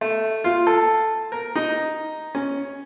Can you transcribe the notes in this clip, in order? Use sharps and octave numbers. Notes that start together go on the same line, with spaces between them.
A3
F4
A4
A#4
D#4
C#4